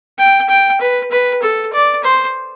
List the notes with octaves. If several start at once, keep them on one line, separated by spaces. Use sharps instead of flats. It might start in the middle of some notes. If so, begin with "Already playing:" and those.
G5
G5
B4
B4
A4
D5
C5